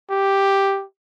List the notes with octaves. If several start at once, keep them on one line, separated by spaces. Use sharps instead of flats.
G4